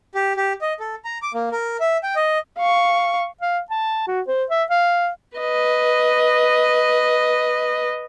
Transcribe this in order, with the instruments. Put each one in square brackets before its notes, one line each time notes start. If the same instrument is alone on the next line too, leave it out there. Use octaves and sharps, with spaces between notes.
[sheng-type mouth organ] G4
G4
D#5
A4
A#5
D6
A#3
A#4
E5
G5
D#5
[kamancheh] F5 C#6
[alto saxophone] F5
A5
F#4
C5
E5
F5
[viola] B4 D#5